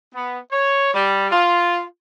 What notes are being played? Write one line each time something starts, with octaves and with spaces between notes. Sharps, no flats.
B3
C#5
G3
F4